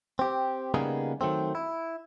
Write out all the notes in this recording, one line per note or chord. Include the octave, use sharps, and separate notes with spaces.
C4 G4
C#3 G3 A#3 B3 D#4 G#4
D#3 F#3 A3 C4
E4